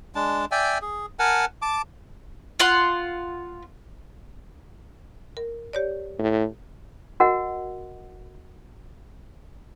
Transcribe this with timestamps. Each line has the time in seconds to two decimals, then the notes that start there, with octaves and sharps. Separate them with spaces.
0.15 G#3 D4 A5
0.51 D5 E5 G5 G#5
0.82 G#4
1.19 A#4 F#5 G#5 A5
1.62 A5 D6
2.60 F4 F#5 C6
5.37 A#4
5.73 G4 C#5 D5
6.19 A2
7.20 F#4 A#4 D#5 F#5